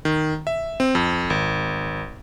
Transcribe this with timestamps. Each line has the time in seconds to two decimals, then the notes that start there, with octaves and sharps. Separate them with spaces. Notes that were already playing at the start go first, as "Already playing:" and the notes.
0.05 D#3
0.47 E5
0.80 C4
0.95 F2
1.30 G#1